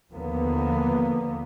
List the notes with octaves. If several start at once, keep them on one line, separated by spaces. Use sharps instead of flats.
D#2 D3 F3 A#3 B3